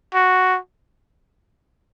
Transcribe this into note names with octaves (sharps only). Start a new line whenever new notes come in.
F#4